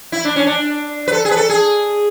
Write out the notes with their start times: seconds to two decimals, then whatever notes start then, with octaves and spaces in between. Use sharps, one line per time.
0.12 E4
0.25 D4
0.36 C#4
0.47 D4
1.08 B4
1.12 A4
1.25 G#4
1.31 B4
1.37 A4
1.49 G#4